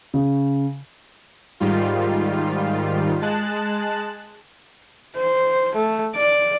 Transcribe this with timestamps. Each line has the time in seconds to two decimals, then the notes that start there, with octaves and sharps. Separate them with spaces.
0.14 C#3
1.60 G#2 D#3 G3 F4
3.21 G#3 A5 F#6
5.17 C5
5.75 A3
6.16 D5